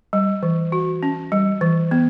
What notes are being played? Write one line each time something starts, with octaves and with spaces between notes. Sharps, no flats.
G3
E3
F#4
C#4
G3
E3
B3